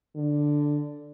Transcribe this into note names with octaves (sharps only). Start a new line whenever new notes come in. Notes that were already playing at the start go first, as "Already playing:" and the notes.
D3